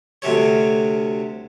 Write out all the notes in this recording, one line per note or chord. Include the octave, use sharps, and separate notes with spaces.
D2 C3 C#5